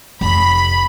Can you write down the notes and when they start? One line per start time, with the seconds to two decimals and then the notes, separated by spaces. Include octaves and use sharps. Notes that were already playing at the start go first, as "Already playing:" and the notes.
0.21 F1 B5